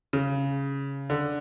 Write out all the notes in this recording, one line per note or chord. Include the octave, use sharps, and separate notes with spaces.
C#3
D3